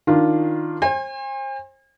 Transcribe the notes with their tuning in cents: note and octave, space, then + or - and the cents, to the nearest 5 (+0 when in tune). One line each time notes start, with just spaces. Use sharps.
D#3 +0 D4 +0 F4 +0
C5 +35 G#5 -40